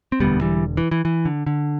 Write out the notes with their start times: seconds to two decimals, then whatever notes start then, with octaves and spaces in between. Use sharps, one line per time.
0.12 C4
0.20 E1 D2 D3 G3 B3
0.41 E3 G3
0.77 E3
0.91 E3
1.05 E3
1.25 D3
1.47 D3